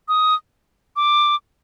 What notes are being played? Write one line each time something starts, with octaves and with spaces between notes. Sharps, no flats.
D#6
D6